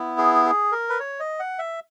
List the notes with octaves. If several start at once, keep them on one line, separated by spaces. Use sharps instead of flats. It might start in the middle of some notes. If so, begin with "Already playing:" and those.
Already playing: B3 E4
G#4
G#4
A#4
B4
C#5
D#5
F#5
E5